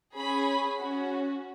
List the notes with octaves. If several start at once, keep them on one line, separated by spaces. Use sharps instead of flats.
C#4 G#4 B5
C#4 F#4